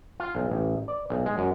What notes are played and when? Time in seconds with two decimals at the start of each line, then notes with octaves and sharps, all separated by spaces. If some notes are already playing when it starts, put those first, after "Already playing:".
0.20 F4
0.35 B1
0.50 A1
0.88 D5
1.10 B1
1.26 G#3
1.38 F#2